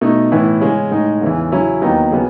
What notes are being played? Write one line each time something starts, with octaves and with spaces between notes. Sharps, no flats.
B2 A3 D#4
A2 E3 B3 E4
C#3 G#3 C#4
A2 G#3 D#4
E2 C#3 E3
C#3 F#3 C#4 E4
D#2 D#3 F#3 B3 D#4
C#3 F#3 B3